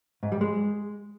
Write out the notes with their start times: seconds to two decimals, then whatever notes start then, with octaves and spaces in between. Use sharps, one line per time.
0.23 G#2
0.32 G3
0.41 G#3